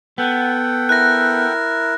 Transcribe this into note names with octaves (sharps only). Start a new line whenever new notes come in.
B3 A4 F#5 G5
E4 A#4 F#6 A#6